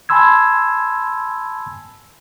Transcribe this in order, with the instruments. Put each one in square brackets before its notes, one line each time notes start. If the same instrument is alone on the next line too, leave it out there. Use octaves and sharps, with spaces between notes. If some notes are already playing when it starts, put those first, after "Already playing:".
[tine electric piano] G#5 A5 B5 C6 E6 G#6